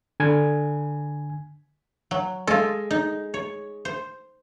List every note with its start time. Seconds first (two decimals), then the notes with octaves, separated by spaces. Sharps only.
0.20 D3 G#5 G#6
2.11 F#3
2.47 G#3 F4 A4
2.91 D#4
3.34 C#5
3.85 C5